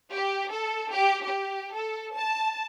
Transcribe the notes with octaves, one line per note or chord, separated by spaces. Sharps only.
G4
A4
G4
G4
A4
A5